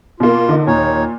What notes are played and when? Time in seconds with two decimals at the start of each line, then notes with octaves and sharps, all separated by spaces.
0.20 B2 A#3 F4
0.49 D3 D#4
0.67 D#2 A#2 D#4 C#5